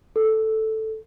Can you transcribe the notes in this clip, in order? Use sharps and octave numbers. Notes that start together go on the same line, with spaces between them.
A4